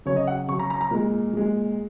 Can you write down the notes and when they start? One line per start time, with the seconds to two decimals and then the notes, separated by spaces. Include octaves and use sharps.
0.06 C#3 F#3 C#5
0.16 D#5
0.27 F#5
0.49 C#3 F#3 C#6
0.59 A#5
0.70 A#5
0.81 A#5
0.91 A#2 G#3 A#4
1.33 A#2 G#3